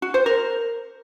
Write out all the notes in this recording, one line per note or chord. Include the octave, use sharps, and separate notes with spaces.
F#4
C5
A#4